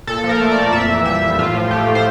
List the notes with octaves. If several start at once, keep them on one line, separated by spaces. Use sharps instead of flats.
A#2 A4
F3
A#4
A3
D5
A#2
F2 E5
E3
G3 E5
F2
A2 F4
F3
A3 G4
A2
C5